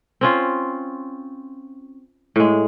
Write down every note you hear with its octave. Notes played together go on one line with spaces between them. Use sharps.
C4 C#4 F4
A2 G#3